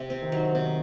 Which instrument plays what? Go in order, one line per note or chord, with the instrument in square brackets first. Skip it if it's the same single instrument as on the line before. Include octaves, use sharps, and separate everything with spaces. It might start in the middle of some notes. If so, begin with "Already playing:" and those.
Already playing: [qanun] C3
C4
[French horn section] D#3
[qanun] F#3
C3